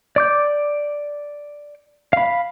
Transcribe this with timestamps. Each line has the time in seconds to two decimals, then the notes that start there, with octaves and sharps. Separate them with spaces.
0.16 D5 D6 G6
2.13 F5 B5